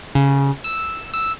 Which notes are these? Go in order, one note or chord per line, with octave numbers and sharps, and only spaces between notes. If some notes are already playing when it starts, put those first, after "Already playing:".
C#3
E6
E6